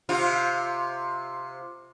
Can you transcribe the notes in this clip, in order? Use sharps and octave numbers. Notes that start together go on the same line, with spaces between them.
C3 F4